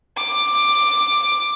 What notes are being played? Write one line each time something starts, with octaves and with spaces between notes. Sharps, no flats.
D6